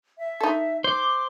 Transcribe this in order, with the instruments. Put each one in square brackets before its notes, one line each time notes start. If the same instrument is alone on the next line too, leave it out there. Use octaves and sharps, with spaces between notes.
[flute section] E5
[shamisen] D#4 A4
[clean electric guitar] C5 [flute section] D6